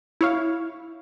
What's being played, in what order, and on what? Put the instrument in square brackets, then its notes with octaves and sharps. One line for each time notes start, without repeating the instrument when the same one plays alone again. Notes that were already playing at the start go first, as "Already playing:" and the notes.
[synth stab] E4 C#5 F5